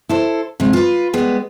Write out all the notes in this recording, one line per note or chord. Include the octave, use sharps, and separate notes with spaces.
E4 A4 C5
C3 G#3
F4 B4
G3 G#3 B3